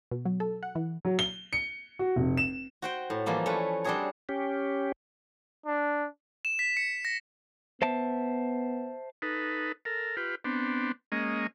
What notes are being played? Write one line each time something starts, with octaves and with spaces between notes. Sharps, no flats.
B2
F#3
A4
F#5
E3
F#3
G7
C#7
F#4
F1
E7
F#4 C5 G5
A2
E3 F3 G3 A#3 C4
A3 C#4 B4
G3 C4 D4 F#4 G#4 C#5
C#4 G4
D4
E7
B6
C#7
A#6
B3 C5 E5 A5
D#4 A4 B4
A4 A#4
F4 G4 B4
B3 C4 D4
G#3 A#3 C#4 D#5